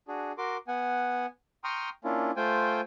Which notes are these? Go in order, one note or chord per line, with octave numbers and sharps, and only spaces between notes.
D4 F#4 G#4
F#4 A#4 C6 D6
B3 F#5 G#5
G5 A#5 C6 C#6 D#6 F6
A#3 C#4 D4 E4 F4
A3 F4 C5 G5 G#5